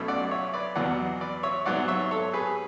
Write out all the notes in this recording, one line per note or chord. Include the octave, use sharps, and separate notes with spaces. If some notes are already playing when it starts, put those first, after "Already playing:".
Already playing: B1 B2 A3 C#4
D5 F#5
C#5 E5
B4 D5
E2 B2 F#3 B3 D5 F#5
B4 D5
C#5 E5
G#2 F#3 B3 D5 F#5
C#5 E5
A4 C#5
G#4 B4